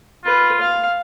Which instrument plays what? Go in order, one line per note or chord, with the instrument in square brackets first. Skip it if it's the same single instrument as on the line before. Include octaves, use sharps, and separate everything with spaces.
[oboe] F4 [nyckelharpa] B4
[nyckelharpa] F5